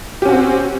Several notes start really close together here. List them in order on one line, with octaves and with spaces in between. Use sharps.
G4 C#4 F#4 C4